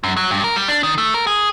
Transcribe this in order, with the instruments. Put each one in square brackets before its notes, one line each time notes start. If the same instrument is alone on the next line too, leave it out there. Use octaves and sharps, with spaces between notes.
[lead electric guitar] F#2
F#3
G2
A#4
G3
D4
D#3
A3
A#4
G#4